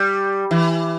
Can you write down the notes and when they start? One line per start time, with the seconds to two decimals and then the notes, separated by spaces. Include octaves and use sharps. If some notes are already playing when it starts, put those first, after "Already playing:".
Already playing: G3
0.51 E3